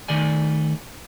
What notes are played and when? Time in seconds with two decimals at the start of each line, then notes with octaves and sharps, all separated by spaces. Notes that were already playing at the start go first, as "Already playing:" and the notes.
0.08 D#3 A3 D5 G#5